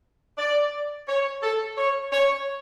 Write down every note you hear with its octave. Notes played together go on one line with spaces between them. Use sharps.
D5
C#5
A4
C#5
C#5